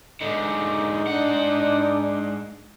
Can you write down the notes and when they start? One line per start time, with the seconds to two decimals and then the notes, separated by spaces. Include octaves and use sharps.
0.21 G#2 D3 D#4
1.07 G#2 D4 F#5